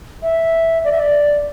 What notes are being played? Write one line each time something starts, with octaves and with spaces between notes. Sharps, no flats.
E5
D5
E5
D5